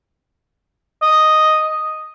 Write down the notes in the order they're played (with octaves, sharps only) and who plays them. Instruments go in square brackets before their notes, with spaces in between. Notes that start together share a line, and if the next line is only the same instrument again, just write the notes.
[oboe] D#5